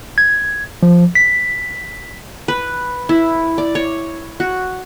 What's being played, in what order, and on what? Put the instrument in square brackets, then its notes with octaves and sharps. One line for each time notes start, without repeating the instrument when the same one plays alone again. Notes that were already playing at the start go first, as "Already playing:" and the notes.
[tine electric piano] G#6
F3
B6
[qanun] B4
E4
D5
C#5
F#4